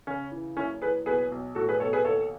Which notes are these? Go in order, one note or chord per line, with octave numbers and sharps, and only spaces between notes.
C#3 C#4
E3
F#1 C#4 E4
E3 G#4 B4
B1 G#4 B4
B1
A2 F#4 A4
G#4 B4
B1 A4 C#5
G#4 B4
D#2 A4 C#5